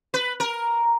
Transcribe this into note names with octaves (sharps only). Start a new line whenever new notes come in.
B4
A#4